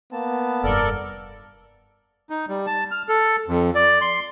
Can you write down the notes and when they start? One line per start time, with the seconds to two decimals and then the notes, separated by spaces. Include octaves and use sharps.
0.12 A#3 B3 A5
0.64 F1 G2 A4 A#4 D5
2.30 D#4
2.49 G3
2.67 A5
2.91 F6
3.09 A4
3.48 F2
3.75 D5
4.01 C6